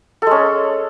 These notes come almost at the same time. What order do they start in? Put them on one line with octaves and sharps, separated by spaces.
A4 G#3 C#4